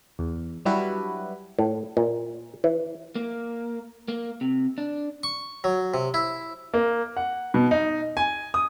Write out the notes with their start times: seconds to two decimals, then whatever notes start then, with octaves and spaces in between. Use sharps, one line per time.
0.19 E2
0.65 F#3 G3 D4 E4 F#4 B4
1.59 A2
1.97 A#2
2.64 E3
3.15 A#3
4.08 A#3
4.41 C3
4.78 D4
5.23 C#6
5.64 F#3
5.94 C3
6.14 E4
6.74 A#3
7.17 F#5
7.54 B2
7.71 D#4
8.17 G#5
8.54 D#6